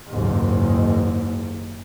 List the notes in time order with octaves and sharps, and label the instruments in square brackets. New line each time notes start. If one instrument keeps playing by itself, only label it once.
[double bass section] F#1 D#2 G#2